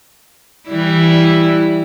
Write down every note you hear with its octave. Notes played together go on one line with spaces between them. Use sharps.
E3 G3 E4